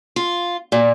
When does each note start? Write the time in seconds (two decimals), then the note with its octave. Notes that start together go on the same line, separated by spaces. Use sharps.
0.16 F4
0.72 A#2